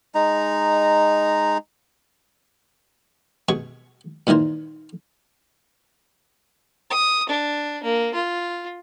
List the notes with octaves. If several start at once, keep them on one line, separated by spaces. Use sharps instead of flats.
G#3 D#4 A#5
B2 G#4 C#6
A#2 D#3 E3 A#4 C5
D#6
D4
A#3
F4